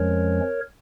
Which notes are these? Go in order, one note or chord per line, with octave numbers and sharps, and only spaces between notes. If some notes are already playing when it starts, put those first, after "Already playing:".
Already playing: F2 F3 G#3 C#4 A#4 C#5